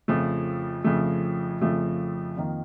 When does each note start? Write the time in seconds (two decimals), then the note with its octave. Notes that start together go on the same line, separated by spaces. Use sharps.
0.08 F2 C#3 F3 A3
0.84 F2 C#3 F3 A3
1.61 F2 C#3 F3 A3
2.37 F2 D#3 A#3